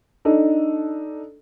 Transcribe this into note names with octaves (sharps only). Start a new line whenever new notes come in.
D4 D#4 A4